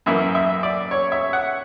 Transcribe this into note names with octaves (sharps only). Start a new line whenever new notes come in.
F#2 E3 A#3 E5
E5
D5
C#5
E5
F#5